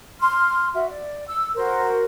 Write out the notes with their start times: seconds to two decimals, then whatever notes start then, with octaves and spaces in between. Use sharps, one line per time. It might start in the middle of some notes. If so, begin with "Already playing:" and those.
0.20 C6 F6
0.74 F#4 E5
0.88 D5
1.27 E6
1.56 F#4 A#4 C5